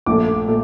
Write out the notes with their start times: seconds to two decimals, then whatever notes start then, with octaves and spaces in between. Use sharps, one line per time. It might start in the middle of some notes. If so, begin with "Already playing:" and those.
0.06 A#1 A#2 A3 D6
0.48 A#2 A3